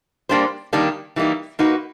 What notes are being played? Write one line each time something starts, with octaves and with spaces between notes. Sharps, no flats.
G3 A#3 D4 G4 C5
D#3 G3 A#3 D4
E3 G3 A#3 D#4
A#3 D#4 F#4 B4